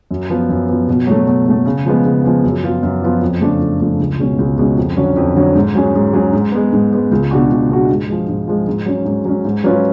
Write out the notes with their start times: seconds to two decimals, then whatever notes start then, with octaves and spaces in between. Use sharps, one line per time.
0.11 F#2
0.30 F3 B3
0.49 F#2
0.69 F3 B3
0.88 B2
1.07 F#3 A3
1.27 B2
1.46 F#3 A3
1.66 C#3
1.85 F3 G#3 B3
2.05 C#3
2.24 F3 G#3 B3
2.44 F#2
2.63 F3 B3 F4
2.83 F#2
3.02 F3 B3 F4
3.22 F2
3.41 C#3 F3 A3 D4
3.60 F2
3.80 C#3 F3 A3 D4
3.99 C#2
4.19 B2 G#3 C#4
4.39 C#2
4.58 B2 G#3 C#4
4.77 F2
4.96 D3 F#3 C#4
5.17 F2
5.36 D3 F#3 C#4
5.55 G#2
5.75 F#3 C#4 G#4
5.94 G#2
6.13 F#3 C#4 G#4
6.33 G#2
6.52 G#3 B3
6.72 G#2
6.92 G#3 B3
7.11 C#2
7.31 B2 G#3 D4 F#4
7.50 C#2
7.70 B2 G#3 D4 F#4
7.89 G#2
8.08 F3 G#3
8.28 G#2
8.48 F3 G#3
8.67 G#2
8.86 F#3 C#4
9.05 G#2
9.25 F#3 C#4
9.45 G#2
9.64 F#3 C#4 F4 B4